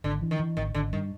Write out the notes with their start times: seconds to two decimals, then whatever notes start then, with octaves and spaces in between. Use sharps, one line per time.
0.04 G#1 D3
0.22 E3
0.31 D#3
0.40 E3
0.57 G#1 D#3
0.74 G#1 D3
0.92 G2 D#3